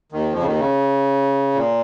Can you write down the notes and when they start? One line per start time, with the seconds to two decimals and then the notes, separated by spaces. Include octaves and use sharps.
0.12 D#2 D#3
0.32 F2 F3
0.39 C#3
0.45 D#2 D#3
0.59 C#3
1.54 A#2